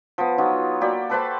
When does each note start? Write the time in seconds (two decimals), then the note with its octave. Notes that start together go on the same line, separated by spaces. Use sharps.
0.18 F3 B3
0.38 F#3 D#4 F4
0.81 A#3 F#4 G4 D5
1.10 A4 B4 C5 A5